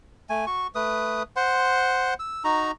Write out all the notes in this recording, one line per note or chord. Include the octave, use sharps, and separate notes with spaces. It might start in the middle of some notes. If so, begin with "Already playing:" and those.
A3 G#5
F#4 C#6
A3 B4 D#6
C5 F#5 C6
E6
D#4 F#4 A#5